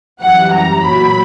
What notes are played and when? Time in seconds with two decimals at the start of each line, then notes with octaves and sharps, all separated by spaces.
0.22 F#2 E3 G3 F#5
0.53 A#5
0.84 A#2 F#3 B5